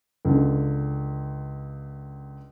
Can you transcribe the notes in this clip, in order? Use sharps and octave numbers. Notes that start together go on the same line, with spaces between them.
C#2 D3